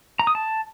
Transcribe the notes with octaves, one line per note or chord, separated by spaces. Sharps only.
A#5
D#6
A5